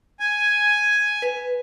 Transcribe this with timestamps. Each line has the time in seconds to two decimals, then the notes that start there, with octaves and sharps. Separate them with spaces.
0.20 G#5
1.22 B4